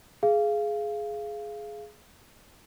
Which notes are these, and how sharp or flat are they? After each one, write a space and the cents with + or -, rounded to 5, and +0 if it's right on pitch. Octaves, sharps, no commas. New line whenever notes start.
G#4 +15 F5 -20